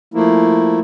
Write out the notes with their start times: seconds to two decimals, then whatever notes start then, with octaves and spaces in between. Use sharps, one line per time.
0.14 F3 A3 A#3 E4